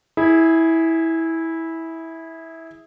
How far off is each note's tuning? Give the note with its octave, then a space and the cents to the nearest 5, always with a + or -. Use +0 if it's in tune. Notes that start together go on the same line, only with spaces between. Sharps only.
E4 -15 G#4 +0